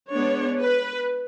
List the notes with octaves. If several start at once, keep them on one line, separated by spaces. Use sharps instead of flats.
G#3 B3 D4 C#5
B4